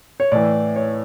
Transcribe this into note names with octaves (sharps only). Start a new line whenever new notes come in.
C#5
A2 E3 D5
C#5